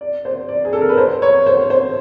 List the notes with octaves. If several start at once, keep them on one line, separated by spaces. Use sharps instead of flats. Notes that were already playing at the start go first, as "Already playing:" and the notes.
D5
C5
D5
G#4
A4
A#4
B4
C5
C#5
C5
C5